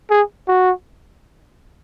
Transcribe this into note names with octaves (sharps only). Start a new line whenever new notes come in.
G#4
F#4